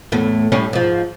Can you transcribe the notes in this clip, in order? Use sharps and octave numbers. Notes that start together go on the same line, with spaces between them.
E2 A2 A3
A2 G3 C#4
G#2 F3